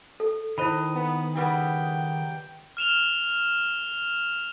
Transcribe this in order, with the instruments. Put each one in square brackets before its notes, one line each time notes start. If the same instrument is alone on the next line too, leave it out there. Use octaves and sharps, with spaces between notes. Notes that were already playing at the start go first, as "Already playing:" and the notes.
[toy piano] A4
[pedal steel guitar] D#3 D#5 [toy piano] E4 C5 B5
[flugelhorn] B3
[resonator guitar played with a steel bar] C#3 G3 B3 [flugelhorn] G5
[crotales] F6 E7 F7 G7